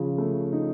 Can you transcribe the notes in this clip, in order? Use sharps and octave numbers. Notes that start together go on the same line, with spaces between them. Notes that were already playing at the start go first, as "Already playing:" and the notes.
Already playing: C#3 F3
A3
D#4